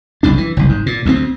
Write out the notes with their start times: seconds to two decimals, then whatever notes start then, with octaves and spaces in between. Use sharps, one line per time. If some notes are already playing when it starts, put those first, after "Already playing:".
0.23 F#1 C2 G2 D4
0.38 E3
0.57 F#1 C2
0.69 G#2
0.86 A#2
1.05 D2 G3 C4